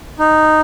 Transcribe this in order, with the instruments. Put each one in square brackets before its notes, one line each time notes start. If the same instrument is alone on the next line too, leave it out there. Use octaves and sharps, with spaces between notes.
[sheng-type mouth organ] D#4